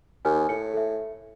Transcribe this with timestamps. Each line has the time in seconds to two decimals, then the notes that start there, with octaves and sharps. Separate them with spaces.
0.25 D#2 G#5 F6
0.49 A2 C#7
0.74 A4 E5